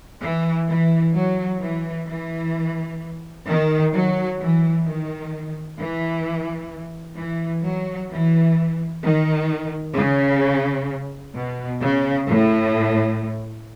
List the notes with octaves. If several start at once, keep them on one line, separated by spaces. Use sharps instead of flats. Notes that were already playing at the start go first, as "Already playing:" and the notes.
E3
E3
F#3
E3
E3
D#3
F#3
E3
D#3
E3
E3
F#3
E3
D#3
C#3
B2
C#3
A2